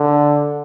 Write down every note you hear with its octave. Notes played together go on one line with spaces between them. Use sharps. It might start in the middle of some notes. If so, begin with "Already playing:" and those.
Already playing: D3